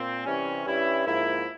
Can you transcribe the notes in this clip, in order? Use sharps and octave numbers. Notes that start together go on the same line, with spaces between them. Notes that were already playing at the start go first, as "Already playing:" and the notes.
Already playing: A#2 C4
C3 E3 G3 C#4
G2 G3 C#4 E4
G#2 F3 A#3 E4